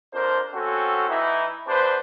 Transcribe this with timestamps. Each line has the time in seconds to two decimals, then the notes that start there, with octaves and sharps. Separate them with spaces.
0.13 F2 D4 A#4 C5
0.53 F#3 C4 C#4 F#4 A4
1.09 E3 D#4 E4
1.67 E2 D4 B4 C5